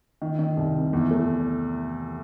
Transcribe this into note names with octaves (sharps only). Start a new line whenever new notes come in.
D#3
D#3
C2
C3
E2
A3